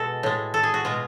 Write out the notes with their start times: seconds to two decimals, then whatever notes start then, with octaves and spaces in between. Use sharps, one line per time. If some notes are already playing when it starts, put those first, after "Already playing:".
Already playing: B2 G#3 F#4 A4
0.23 A2 G#3
0.54 A4
0.63 G#4
0.74 F#4
0.85 B2 G#3 F4